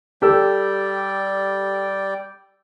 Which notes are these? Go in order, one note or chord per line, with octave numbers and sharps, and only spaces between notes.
G3 G4 A4 D5 G5 E6